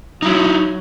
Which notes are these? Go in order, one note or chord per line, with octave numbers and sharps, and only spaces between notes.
F#3 D#4 E4